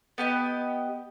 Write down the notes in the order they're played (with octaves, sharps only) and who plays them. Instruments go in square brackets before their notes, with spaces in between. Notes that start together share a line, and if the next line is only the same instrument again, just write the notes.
[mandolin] B3 G4 D#5